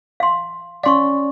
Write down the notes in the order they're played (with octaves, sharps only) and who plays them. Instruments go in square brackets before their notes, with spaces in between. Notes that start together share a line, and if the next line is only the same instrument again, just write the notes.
[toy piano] F5 C6
[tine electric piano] C#4 D5 [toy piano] F5 C6 C#6